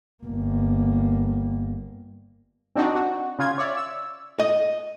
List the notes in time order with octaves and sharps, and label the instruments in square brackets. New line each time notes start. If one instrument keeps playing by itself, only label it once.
[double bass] G1 A#3
[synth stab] C4 D4 D#4 F#4
F#4
C#3 F4 G#6
C#5 D5 E5
E6
[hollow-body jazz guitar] D#5